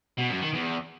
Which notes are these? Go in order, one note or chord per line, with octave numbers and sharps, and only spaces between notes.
B2
F#2
D#3
E2